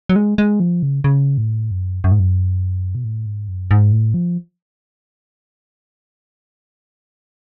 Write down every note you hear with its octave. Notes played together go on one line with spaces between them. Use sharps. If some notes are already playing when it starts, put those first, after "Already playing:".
F#3
G#3
G#3
F3
C#3
C#3
A2
F#2
F#2
G#2
F#2
B2
A2
G#2
F#2
G#2
A2
F3